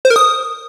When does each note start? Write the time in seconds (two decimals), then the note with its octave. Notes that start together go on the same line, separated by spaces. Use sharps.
0.05 C5
0.10 A#4
0.16 D#6